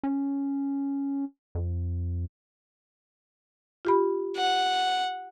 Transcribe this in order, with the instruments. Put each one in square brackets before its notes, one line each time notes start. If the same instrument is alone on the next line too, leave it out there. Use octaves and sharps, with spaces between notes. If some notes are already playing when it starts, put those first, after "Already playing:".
[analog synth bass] C#4
F2
[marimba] F4 G4 B5
[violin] F#5